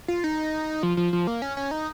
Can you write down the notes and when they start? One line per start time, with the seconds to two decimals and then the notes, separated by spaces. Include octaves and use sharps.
0.08 F4
0.24 D#4
0.83 F3
0.97 F3
1.13 F3
1.27 A#3
1.42 C#4
1.57 C#4
1.71 D#4